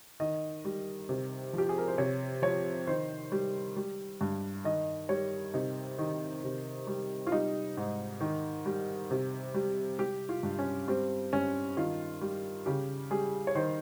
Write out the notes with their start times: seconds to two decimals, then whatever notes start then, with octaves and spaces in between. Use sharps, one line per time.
0.20 D#3 D#5
0.65 G3
1.09 C3
1.53 F3 G4
1.69 G#4
1.78 A#4
1.88 C5
1.98 C3 C#5
2.42 F3 C#5
2.87 D#3 C5
3.32 G3
3.77 G3
4.21 G2
4.64 D#3 D#5
5.09 G3 C#5
5.54 C3 D#4
5.98 D#3
6.44 C3
6.87 G3
7.27 F4
7.32 G3 D#4
7.77 G#2
8.21 D#3
8.66 G3
9.11 C3
9.54 G3
9.99 G3 G4
10.29 F4
10.43 G2
10.59 C#4
10.88 G3 C4
11.33 G2 C#4
11.77 D#3 F4
12.21 G3
12.66 C#3 G4
13.11 G3 G#4
13.47 C#5
13.55 D#3 C5